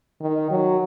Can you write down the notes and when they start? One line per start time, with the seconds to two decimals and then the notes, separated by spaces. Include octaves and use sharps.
0.21 D#3
0.50 F#3